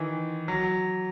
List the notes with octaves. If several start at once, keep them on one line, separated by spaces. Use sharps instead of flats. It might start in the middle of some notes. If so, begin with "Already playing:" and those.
Already playing: D#3 E3
F#3